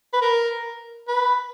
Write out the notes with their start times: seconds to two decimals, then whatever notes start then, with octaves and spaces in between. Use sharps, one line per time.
0.13 B4
0.22 A#4
1.08 B4